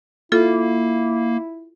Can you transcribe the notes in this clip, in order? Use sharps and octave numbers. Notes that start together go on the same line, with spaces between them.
A#3 E4 F4 A4